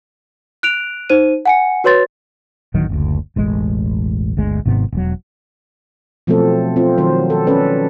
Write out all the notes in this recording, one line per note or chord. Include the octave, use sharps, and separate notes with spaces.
F#6 D7 F7
D#4 C5 D#7
F#5 G#5 C#7
F#4 B4 C#5 C6 A6
D1 A1 D#3 F#3
F#1 D2
E1 A1 G#3
G1 D2 G#3
G#1 G#2 C3 B3
E1 F#3
B2 F3 F#3 A3 C4 A4
C4 F4
D#3 F#3 C5
A4
C#4 A4 B4 D5